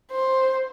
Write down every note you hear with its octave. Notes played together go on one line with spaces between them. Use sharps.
C5